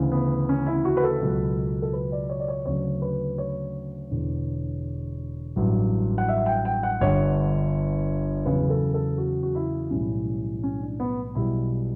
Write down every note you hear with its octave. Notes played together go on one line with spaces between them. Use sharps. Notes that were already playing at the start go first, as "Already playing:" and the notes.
Already playing: D2 C#3 E3
B3
C#4
E4
F#4
B4
A4
C#2 B2 F#3
A4
B4
D5
C#5
D5
C#5
D2 C#3 F#3 C#5
B4
C#5
E1 E2 D3
A1 G2 F#3
F#5
E5
G5
G5
F#5
G1 G2 D3 C#5
E2 C#3 F#3 B4
A4
A4
F#4
F#4
E4
B1 A2 E3 G3 C#4
C#4
D4
B3
B1 B2 G3 E4